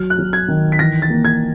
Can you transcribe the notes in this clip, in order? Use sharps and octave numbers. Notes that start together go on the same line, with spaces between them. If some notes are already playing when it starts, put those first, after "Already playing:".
Already playing: F#3 F6
F#6
F#3
G#6
D#3
B6
E3 A#6
A6
A#3
G#6